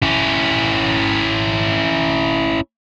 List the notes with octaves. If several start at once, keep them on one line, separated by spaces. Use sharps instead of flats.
C#4 E4